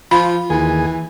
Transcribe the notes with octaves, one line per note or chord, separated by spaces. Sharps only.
F3 F4 B5
D#2 E3 G#4 G#5